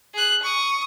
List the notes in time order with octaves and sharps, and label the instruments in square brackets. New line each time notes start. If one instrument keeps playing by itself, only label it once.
[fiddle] G#4 F#6
C#6 D#6